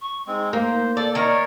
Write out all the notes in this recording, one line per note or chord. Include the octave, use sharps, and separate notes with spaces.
C#6
G#3 C4 D#4
A#3 C5
A4 D5
D#3 A#4 C#5 D5